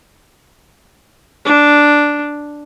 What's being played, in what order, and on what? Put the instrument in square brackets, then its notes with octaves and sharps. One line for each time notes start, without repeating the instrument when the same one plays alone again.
[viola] D4